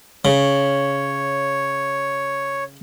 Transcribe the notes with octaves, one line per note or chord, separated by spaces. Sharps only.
C#3 C#5